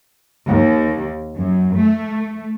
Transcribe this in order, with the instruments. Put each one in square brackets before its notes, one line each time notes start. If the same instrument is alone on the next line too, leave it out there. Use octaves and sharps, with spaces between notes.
[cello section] D#2
F#2
A3